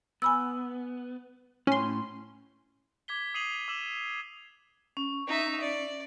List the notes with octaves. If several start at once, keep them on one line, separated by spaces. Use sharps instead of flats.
B3 G#5 B5 E6
A2 C#4 C6
D6 G#6 B6 G7
D#6 C7 D#7 F7 F#7
D6 E6 E7 F#7
C#4
D#4 E5
D5